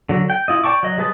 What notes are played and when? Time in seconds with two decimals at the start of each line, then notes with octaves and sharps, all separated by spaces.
0.09 D3 F#3
0.30 G5
0.48 E4 F4 D#5
0.64 D5 G5 A5 C#6 D6
0.83 F#3 D#5
0.98 G3 G#3 B4 D#5 A5